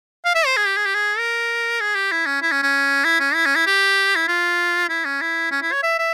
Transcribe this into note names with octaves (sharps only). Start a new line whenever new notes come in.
F5
E5
C5
G#4
G4
G#4
G4
G#4
A#4
G#4
G4
E4
C#4
E4
C#4
C#4
E4
C#4
E4
C#4
E4
G4
E4
F4
E4
C#4
E4
C#4
E4
C#5
E5
E5